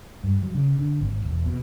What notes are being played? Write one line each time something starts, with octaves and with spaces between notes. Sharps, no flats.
G2
F#3
C#3
D3
G#1
E1
B2